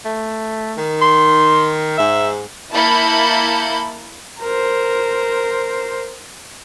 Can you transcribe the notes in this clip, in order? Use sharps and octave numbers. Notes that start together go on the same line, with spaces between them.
A3
D#3
C6
G#2 E5
A#3 E4 A5 B5 G6 C#7
A#4 C5